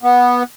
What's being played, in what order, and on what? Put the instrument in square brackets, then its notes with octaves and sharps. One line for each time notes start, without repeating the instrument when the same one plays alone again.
[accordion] B3